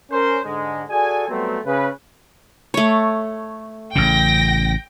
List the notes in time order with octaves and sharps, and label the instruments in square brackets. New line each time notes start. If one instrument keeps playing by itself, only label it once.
[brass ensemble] C#4 A#4 C5
G#2 D3 G#3
F#4 G#4 A4 D5 G#5
F#3 G3 A3 B3 C4
C#3 B4
[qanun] A3 C#5
[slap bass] A1 C#3 [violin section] G5 A#6